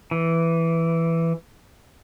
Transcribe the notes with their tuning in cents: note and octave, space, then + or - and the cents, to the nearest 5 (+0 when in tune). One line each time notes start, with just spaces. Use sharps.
E3 +5